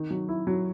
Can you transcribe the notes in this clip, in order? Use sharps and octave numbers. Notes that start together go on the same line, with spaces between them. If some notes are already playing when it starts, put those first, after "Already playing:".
Already playing: D#3
F#3
E4
F#3